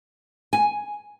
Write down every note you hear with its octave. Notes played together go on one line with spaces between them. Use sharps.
G#5